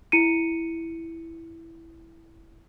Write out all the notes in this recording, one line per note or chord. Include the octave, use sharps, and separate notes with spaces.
E4 C#7 D#7